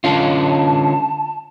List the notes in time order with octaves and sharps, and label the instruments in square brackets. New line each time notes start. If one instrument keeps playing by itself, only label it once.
[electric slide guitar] D3 C#4 F4 [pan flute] A5